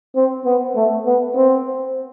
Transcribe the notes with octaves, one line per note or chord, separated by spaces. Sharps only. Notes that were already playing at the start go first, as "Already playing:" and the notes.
C4
B3
A3
B3
C4